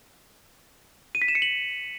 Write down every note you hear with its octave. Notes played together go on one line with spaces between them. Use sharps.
D#7
B6
E7
C#7
F#7